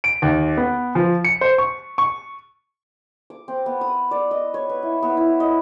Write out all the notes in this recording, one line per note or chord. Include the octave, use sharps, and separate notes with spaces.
D7
D#2
B3
F3
C#7
C5
C#6
C#6
D6
C4
B3
D#6
D5
D#5
C#5
B4
E4
B3
E4
D#5